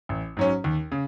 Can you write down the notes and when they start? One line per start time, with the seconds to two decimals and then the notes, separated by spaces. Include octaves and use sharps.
0.09 A1
0.37 G#2 F#3 C#4
0.64 D#2
0.92 C#3